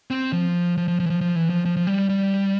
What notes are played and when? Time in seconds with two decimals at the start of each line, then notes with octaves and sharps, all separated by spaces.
0.11 C4
0.32 F3
0.77 F3
0.88 F3
1.00 F3
1.06 E3
1.10 F3
1.21 F3
1.36 E3
1.50 F3
1.65 F3
1.77 F3
1.87 G3
2.09 G3